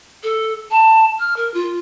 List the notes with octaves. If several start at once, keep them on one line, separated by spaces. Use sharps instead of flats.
A4
A5
F6
A#4
F4